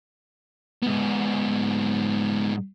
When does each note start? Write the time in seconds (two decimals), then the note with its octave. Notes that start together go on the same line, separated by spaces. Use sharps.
0.83 G#2 B3